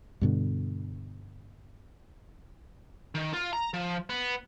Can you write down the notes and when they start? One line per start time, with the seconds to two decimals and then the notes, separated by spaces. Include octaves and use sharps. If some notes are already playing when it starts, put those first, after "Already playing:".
0.21 G2 B2 D3
3.15 D#3
3.33 F4
3.53 A#5
3.74 F3
4.10 B3